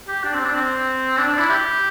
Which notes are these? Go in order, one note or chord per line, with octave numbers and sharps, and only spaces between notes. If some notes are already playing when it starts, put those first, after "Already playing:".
G4
D4
C4
D4
C4
D4
D4
E4
G4